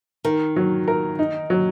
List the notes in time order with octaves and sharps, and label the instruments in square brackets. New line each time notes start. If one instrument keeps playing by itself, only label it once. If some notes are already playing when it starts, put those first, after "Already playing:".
[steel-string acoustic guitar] D#3 [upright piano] A#4
[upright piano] F#3
A#4
D#4
F#3